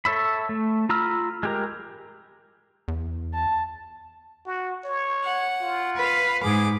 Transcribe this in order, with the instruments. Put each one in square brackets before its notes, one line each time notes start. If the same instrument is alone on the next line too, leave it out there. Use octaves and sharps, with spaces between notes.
[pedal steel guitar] A4 C#5 E5 B5
A3
F4 A#5 B5 E6 F6
G#3 G4 A#4
[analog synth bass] E2
[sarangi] A5
[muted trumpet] F#4
C#5
[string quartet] F#5
[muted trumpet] F4
[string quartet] B4 F5
[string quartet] G#2 D6 [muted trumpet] G#4